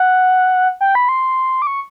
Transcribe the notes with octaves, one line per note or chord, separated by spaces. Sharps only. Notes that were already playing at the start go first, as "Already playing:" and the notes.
Already playing: F#5
G5
B5
C6
D6
C#6